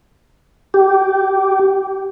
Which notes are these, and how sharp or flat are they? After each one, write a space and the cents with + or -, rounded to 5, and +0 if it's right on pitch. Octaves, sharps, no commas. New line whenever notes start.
G4 -15